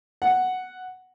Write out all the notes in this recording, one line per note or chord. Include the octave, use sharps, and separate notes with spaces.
F#5